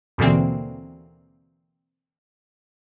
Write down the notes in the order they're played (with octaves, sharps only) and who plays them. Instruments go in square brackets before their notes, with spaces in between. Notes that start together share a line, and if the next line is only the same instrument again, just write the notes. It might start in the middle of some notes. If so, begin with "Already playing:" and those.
[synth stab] D#2 B2 D3 E3 A#3 C4